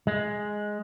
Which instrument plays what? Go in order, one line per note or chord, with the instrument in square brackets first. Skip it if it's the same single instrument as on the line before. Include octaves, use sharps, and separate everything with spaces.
[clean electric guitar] G#3